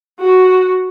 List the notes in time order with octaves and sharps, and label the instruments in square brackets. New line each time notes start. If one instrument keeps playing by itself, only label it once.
[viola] F#4